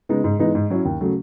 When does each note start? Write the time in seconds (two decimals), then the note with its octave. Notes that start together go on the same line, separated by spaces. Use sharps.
0.09 C#3 G#3 B3 D#4
0.24 G#2
0.39 E3 G#3 B3 D#4
0.55 G#2
0.70 F#3 C#4 E4
0.85 D#2
1.01 C#3 F#3 A3